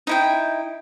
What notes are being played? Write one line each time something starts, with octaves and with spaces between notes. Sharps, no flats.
D#4 E4 G5